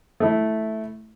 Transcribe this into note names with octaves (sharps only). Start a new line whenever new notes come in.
A3 E4